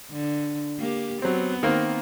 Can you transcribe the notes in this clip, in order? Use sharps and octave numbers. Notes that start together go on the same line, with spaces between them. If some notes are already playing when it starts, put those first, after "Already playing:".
D3
A#3 G4
F#3 B3 C4
D#3 A#3 C4